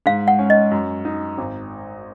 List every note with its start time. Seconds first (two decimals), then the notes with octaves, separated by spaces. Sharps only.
0.06 G#2 F5
0.28 F#5
0.39 C#4
0.50 D#5
0.71 F#2
1.05 D#4
1.38 G#1